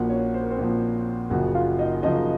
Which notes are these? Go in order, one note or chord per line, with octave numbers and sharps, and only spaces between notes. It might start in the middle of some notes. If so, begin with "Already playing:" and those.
Already playing: A#1 A#2 F3 F#4 F#5
C#4 C#5
C5
A#4
C4 C5
A#1 A#2 F3
F#1 F#2 C#3 F3 F#4 F#5
F4 F5
D#4 D#5
F#1 F#2 C#3 F3 D#4 D#5